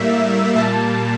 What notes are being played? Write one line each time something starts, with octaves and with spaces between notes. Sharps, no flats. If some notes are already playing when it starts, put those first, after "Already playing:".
Already playing: A2 G3 A#3 E5
A#2 G3 A#3 A5